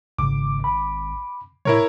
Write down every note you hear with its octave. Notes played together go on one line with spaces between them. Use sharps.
G#1 G#2 C#3 D6
B5
A2 E4 A#4 C#5